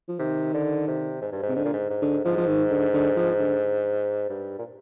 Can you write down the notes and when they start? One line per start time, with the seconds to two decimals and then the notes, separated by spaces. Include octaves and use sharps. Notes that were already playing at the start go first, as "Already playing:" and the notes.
0.08 F3
0.19 C3 D#3
0.54 D3
0.88 C3
1.21 G#2
1.32 G2
1.42 G#2
1.49 C3
1.56 G#2 D3
1.65 A#2
1.73 G#2
1.90 G#2
2.02 D3
2.24 G#2 F3
2.37 F3
2.47 D#3
2.70 D3
2.93 D3
3.16 F3
3.39 D3
4.30 G2
4.59 A#2